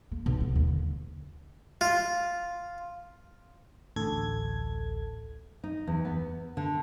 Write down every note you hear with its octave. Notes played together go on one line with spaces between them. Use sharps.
A#3
B1
B3
D#2
D3
F4
A1 D2 A4 G#6
D#4
E2
B3
D3